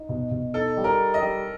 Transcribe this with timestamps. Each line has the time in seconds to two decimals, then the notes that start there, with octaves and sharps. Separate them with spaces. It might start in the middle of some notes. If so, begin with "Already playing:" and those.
Already playing: D#4
0.09 B2
0.31 B2
0.54 D#4 A4
0.77 G3
0.84 A#4
0.99 D#4
1.14 D#5
1.21 G3